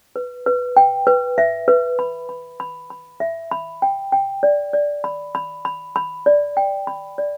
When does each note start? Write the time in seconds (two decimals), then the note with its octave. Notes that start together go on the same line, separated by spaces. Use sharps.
0.16 B4
0.46 B4
0.77 G5
1.07 B4
1.38 E5
1.68 B4
1.99 B5
2.29 B5
2.60 B5
2.90 B5
3.20 E5
3.51 B5
3.82 G5
4.12 G5
4.43 D5
4.73 D5
5.04 B5
5.35 B5
5.65 B5
5.96 B5
6.26 D5
6.57 G5
6.87 B5
7.18 D5